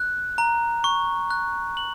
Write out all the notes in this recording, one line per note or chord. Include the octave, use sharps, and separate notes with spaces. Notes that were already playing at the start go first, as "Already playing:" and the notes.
Already playing: F#6
A#5
C#6
F#6
F#7